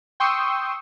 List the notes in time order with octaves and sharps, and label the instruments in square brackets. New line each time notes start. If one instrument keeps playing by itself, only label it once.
[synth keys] G5 C6 C#6 D#6 E6